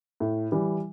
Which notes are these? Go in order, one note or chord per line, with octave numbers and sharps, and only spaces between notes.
A2
E3 G3